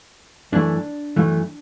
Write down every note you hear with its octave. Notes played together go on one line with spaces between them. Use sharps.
F#2 E3 A3 D4
F#2 E3 A3